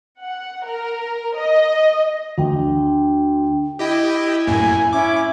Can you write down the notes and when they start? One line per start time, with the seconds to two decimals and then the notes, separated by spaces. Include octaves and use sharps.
0.21 F#5
0.65 A#4
1.36 D#5
2.38 D2 D4 G5
3.79 E4 G4 D#5 G5
4.47 F#2 A2 A#3 G#5
4.93 C#4 E4 D6